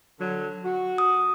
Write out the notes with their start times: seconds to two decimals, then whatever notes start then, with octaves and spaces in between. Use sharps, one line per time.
0.20 D3 F#3
0.65 F#4
0.98 D#6